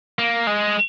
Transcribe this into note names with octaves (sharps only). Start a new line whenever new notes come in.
A#3
G#3